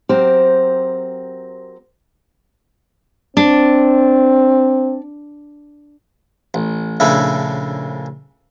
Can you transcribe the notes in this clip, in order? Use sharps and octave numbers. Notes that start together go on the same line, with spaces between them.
F#3 C4 G4 A#4 C5
C4 D4
A1
A#1 A2 C#3 D4 E4